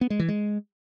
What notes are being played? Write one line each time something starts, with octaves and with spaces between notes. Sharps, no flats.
B3
G#3
E3
G#3